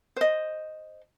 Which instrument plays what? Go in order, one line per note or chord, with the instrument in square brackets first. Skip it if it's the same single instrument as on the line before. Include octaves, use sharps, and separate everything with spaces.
[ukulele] C5 D#5